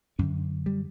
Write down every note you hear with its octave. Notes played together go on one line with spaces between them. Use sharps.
F#2 D3 C#4
G3